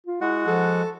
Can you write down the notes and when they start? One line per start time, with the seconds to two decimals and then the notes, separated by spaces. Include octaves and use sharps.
0.07 F4
0.21 G#3 E4 F#4 F#5
0.47 F3 A4